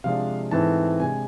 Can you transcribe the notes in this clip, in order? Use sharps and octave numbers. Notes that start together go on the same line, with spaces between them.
C3 F3 G#3 D4 F5
G#2 E3 A3 C4 A5
C3 G#3 D4 G#5